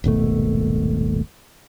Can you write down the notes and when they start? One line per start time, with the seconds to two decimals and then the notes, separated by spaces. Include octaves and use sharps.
0.04 D#1 G#1 B2 A3